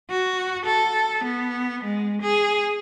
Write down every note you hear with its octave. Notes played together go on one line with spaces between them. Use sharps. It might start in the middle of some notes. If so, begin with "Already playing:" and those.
F#4
A4
B3
G#3
G#4